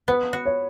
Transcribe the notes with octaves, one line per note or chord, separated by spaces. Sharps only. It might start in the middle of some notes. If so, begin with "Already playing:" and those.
B3 B4
F#4
C#5